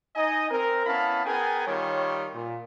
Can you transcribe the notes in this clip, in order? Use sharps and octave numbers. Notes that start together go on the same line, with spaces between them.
D#4 D#5 G#5
C4 A#4
B3 C#4 E4 F5 A5 B5
B3 G#4 A#4 G5 G#5
D#3 G3 F4 C#5
A#2